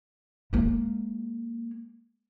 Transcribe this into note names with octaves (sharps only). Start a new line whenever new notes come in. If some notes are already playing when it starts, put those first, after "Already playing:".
G#3 A#3